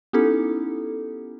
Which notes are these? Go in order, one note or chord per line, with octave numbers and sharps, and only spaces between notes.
B3 C#4 D#4 E4 G4 A4